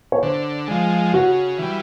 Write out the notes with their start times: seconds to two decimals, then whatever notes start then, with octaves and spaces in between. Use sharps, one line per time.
0.12 C#5
0.23 D3 C5
0.68 F3 G#3
1.13 C#3 F#4
1.59 E3 G3